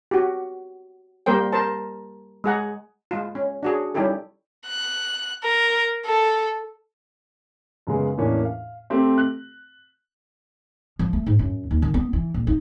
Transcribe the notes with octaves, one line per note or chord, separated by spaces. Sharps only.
F#4 G4
G3 A#3 A#4 C5 G5
A#4 C5 A5
G#3 G#4 F#5 A#5
G#3 F4
C#4
D4 F#4 G#4
G3 C#4 D#4 E4 G4 A4
F#6
A#4
A4
F#2 C#3 G#3 B3
E2 A2 A#3 C#4 D4
F5
A3 C4 G4
F#6
F3
A3
G#2
F#2
D#2
D#3
B3
E3
A#1
D#4